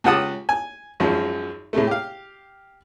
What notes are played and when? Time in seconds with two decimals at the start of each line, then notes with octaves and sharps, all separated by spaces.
0.04 C#2 F4 G4 F#5 A5 D#6
0.49 G#5
1.00 G#1 F#2 F3 G#3
1.73 A2 C3 G#3 A3
1.87 G4 F5